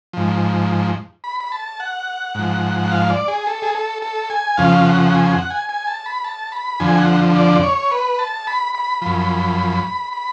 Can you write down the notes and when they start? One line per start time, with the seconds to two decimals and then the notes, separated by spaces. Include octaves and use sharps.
0.13 G#2 F3
1.24 B5
1.40 B5
1.52 A5
1.80 F#5
2.35 G#2 F3
2.91 F5
3.10 D5
3.28 G#4
3.47 A4
3.62 G#4
3.75 A4
4.02 A4
4.30 G#5
4.57 F2 C#3 F3 F5
4.85 F#5
5.14 G#5
5.24 G#5
5.32 F#5
5.50 G#5
5.69 G#5
5.87 A5
6.06 B5
6.24 A5
6.52 B5
6.80 F2 D3 F3 G#5
6.98 F#5
7.36 D5
7.63 C#5
7.91 B4
8.19 A5
8.47 B5
8.75 B5
9.02 F#2 F3
10.13 B5